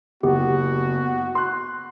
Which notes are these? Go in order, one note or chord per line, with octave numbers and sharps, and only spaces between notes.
F#1 B3 F#4 G4
C6 F#6